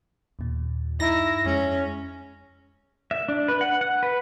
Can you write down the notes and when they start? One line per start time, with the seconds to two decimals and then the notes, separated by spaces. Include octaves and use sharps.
0.39 D#2 A#2
1.00 G2 D#4 E4 A#5 A#6
1.45 F2 G#3 C#4
3.11 E5
3.29 D4
3.48 B4
3.61 F#5
3.81 F#5
4.03 B4